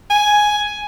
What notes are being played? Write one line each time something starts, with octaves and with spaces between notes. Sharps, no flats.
G#5